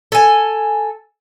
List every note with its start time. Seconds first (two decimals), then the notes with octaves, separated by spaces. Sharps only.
0.12 A4 G#5